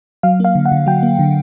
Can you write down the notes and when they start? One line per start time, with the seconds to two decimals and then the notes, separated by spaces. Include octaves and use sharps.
0.23 F#3 F5
0.40 A#3 F5
0.55 D3
0.66 F#5
0.72 D3
0.86 F#3 G5
1.03 A#3
1.19 D3